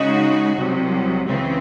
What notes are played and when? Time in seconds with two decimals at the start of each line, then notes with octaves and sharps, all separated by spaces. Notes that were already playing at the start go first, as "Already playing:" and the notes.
Already playing: C#3 G#3 D#4 F#4
0.56 C2 C3 F#3
1.26 C#2 C#3 E3 C4